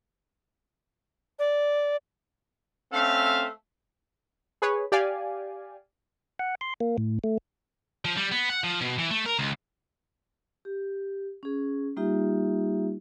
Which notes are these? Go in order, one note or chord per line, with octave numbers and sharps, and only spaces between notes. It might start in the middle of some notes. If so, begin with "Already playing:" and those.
D5
A3 C4 C#4 A4 E5 F5
G#4 B4 C#5
G4 D5 F5 G#5
F#5
C6
A#3
A2
A3
F3
G3
B3
F#5
F3
B2
E3
A3
A#4
C#2
G4
C#4 G#4
G3 A#3 D#4 F4 G4 E5